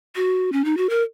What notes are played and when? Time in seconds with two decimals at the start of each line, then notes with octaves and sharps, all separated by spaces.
0.16 F#4
0.53 C#4
0.65 D#4
0.77 F#4
0.90 A#4